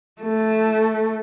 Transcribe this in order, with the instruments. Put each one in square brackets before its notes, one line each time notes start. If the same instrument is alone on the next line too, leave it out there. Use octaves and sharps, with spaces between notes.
[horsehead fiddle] A3